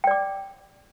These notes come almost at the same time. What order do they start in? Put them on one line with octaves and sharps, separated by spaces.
G5 D5 D6